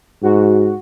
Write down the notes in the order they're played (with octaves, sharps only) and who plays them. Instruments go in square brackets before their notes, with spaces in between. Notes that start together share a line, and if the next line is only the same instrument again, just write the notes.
[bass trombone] G#2 [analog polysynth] F#4